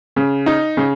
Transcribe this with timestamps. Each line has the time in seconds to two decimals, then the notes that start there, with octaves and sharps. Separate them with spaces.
0.16 C#3
0.46 D#4
0.77 C#3